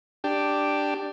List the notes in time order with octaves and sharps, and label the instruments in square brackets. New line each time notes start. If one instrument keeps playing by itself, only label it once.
[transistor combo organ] D4 G4